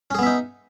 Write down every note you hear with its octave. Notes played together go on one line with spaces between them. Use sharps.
B3 C#4 D#4 G#4 E5